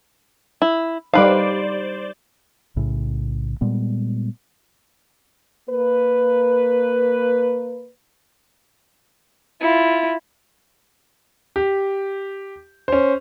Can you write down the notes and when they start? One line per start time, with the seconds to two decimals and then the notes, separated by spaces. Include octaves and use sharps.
0.62 E4
1.14 G3 D#4 B4 C5 D5 F5
2.76 B1 A2 C#3
3.61 A#2 G3 G#3 B3
5.68 A#3 B4
9.61 E4 F4
11.56 G4
12.88 C#4 C5